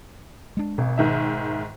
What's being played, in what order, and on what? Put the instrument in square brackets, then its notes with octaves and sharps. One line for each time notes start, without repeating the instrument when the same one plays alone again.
[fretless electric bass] G#3 D4
[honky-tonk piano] G#1 [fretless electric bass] B2
[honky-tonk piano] G#2 D#3 E5